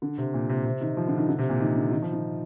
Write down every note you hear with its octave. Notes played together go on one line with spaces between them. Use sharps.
D3
C3
A#2
C3
C3
D#3
F3
D3
D#3
D3
C3
A#2
D#3
D3
D#3
F3
D#3